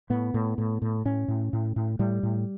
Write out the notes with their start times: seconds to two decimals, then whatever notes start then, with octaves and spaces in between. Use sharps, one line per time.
0.10 A2 B3
0.34 A2
0.58 A2
0.82 A2
1.05 A2 C#4
1.28 A2
1.53 A2
1.76 A2
1.99 A2 G3
2.23 A2